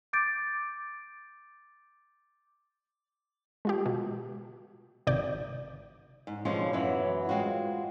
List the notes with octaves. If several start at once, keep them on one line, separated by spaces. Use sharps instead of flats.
D6 G6 A6 D7
G#3 F4 G4
B2
G#1 C3 D5 G6
G#2
B2 D3 F3 G#3 C#4
F#2 E3 F#3 B3 B4
G#3 C4 F4 F#4